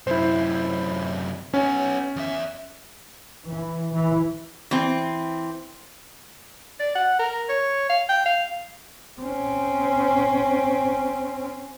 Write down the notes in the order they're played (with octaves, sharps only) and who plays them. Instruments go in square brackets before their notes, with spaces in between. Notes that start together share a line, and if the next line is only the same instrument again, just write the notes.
[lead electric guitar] F#2 C3 [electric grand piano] E4 C5
[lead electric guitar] B3 C#5 [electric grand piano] C#4
[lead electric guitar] E2 E5
[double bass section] E3
E3
[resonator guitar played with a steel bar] E3 C4
[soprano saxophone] D5
F#5
A#4
C#5
F5
G5
F5
[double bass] C4 C#4